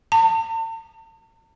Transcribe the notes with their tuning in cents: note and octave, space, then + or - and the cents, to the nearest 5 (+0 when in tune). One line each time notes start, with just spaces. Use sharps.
A5 +45